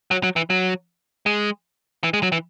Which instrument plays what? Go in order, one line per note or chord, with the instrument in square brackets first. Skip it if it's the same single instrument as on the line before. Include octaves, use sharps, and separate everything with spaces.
[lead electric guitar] F#3
F#3
E3
F#3
G#3
E3
G#3
F#3
E3